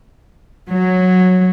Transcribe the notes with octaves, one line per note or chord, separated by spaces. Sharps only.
F#3